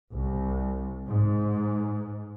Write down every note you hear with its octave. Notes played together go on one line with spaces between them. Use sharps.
C2
G#2